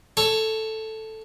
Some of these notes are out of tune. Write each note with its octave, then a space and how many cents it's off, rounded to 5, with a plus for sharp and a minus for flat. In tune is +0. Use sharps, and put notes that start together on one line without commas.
A4 +0 C#5 +0